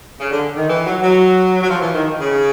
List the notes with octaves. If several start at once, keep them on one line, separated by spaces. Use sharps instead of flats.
C#3
D3
D#3
E3
F#3
F#3
F#3
F3
E3
D#3
C#3